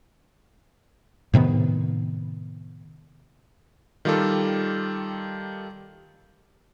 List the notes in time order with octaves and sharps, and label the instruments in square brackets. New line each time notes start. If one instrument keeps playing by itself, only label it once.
[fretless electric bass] A2 C3 D#3 B3
[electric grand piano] D#3 G3 F4 G4 A4